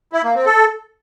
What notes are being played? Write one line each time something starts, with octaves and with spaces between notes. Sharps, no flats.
E4
A#3
C4
A4